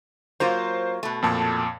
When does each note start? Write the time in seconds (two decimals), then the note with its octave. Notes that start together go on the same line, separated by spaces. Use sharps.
0.40 F#3 A#3 F4 C5
1.03 B2 A3
1.22 F2 A#2 A5